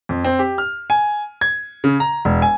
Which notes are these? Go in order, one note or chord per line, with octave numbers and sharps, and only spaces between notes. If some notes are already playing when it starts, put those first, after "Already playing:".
F2
C4
G4
F6
G#5
G#6
C#3
A#5
E1
G#5